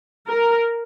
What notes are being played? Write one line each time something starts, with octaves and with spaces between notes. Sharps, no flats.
A#4